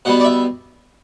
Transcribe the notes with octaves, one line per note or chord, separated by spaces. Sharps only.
B2 G3 B3 F#5
D5
E5